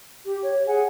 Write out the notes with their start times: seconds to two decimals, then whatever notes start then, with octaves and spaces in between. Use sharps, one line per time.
0.24 G4
0.43 C#5
0.67 G#4 F#5 G#5